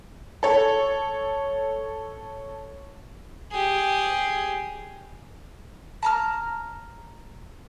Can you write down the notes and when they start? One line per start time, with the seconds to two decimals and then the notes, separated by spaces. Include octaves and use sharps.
0.43 A4 C#5
3.51 G4 G#4
6.03 A5 A#5 F6